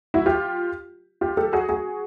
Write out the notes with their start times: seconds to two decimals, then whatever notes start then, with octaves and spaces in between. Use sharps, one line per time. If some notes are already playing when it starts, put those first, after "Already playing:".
0.14 E4 F#4
0.26 F4 G4
1.21 F4 G4
1.37 G4 A4
1.53 F#4 G#4
1.69 F#4 G#4